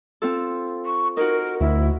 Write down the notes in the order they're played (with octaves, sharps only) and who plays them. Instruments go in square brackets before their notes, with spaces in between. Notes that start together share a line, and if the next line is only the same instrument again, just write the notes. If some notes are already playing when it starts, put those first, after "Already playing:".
[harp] C4 F4 A4
[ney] C#6
[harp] D#4 F#4 [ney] A#4
[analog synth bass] D2 [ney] E4